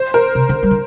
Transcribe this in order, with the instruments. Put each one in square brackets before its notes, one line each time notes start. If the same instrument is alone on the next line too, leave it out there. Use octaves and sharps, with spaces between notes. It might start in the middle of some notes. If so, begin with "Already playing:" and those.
Already playing: [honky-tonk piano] C5
A#4
[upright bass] C3
D3
G3
D3